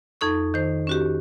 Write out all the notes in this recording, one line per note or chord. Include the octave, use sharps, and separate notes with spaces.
F2 D#4 A4 C#6
D#3 C5
C#4 F#4 G4